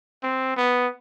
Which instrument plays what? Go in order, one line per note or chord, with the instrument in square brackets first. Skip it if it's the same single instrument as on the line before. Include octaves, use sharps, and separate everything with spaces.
[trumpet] C4
B3